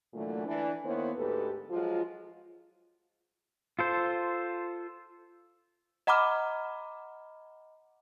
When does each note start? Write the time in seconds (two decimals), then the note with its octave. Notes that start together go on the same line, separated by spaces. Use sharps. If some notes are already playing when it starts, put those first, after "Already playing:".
0.14 A#2 D3 E3 F#3 A3
0.46 E3 D4
0.85 D#3 A#3 B3 E4 C5 C#5
1.16 D2 G#2 G4 A4 B4
1.70 F3 F#3 G#3 F4
3.79 F4 A4 C5
6.07 D#5 F#5 A#5 B5 D6 F6